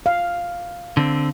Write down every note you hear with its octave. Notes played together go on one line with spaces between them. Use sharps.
F5
D3 C4